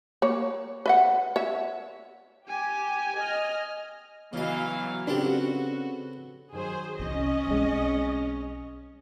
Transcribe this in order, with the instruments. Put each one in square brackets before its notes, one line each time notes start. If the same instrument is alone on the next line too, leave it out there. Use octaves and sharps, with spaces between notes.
[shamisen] A#3 C#5
B4 E5 F#5
C#5 E5
[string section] G4 [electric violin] G#5
[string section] D#5 F6
[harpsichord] C#3 D#5 [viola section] E3 F#3 F5 [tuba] B3
[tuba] C#3 [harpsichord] B3 C4 A4 [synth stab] D4 G4 [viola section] F#4
[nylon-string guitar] D#3 F3 F#3 [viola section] G#4 C5
[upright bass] C2 E3 [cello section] C#4 [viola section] D#5
[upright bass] B1 E3 [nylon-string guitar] G#3 C4